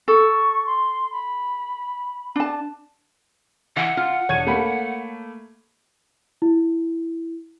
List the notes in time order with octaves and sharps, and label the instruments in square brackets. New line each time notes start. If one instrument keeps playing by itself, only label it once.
[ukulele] A4 [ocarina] C#6
[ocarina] C6
B5
[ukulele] D4 A5
[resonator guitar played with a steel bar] E3 [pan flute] F#5
[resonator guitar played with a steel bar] F4
[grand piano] E1 G#6 D#7 [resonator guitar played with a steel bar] C#5
[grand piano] A3 A#3 B5
[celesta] E4